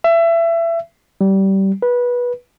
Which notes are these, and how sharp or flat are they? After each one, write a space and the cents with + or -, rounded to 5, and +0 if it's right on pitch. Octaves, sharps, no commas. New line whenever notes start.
E5 +25
G3 -20
B4 -20